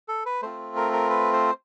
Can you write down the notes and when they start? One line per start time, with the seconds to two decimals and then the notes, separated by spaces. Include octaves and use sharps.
0.08 A4
0.26 B4
0.42 A3 C4 F4 C5
0.76 A#4
0.93 A#4
1.10 B4
1.33 C5